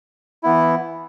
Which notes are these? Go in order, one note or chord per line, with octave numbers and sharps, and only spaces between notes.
E3 B3 E4